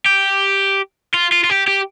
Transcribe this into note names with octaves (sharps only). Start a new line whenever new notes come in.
G4
F4
F4
F4
G4
G4